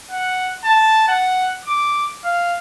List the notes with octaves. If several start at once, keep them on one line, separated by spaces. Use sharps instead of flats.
F#5
A5
F#5
D6
F5